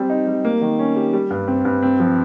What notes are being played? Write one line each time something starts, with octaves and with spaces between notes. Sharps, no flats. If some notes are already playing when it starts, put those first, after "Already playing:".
Already playing: G3 C4
D#4
G3
A#3
D#3
C#4
G4
G3
G2
C4
G2
C4
F3